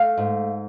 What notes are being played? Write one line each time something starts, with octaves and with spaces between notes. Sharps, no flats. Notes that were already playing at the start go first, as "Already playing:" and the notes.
Already playing: A3 F5
G#2